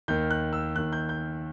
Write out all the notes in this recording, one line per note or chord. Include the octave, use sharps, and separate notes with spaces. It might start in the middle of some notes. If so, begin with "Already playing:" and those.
D#2 D#3 G6
F#6
E6
D#2 D#3 F#6
G6
G6